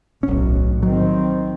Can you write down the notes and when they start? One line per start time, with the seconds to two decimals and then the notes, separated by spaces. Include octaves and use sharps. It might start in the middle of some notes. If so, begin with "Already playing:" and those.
0.23 D1 B1 A2 F#3 C#4
0.83 D#3 F#3 C4